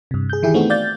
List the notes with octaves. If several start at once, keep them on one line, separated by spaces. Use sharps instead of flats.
G2 C3
G#4 G6
D#3 E3 E4 G4 G#4
A3 B3 C4 D#4 F#4
D5 F5 G6 A6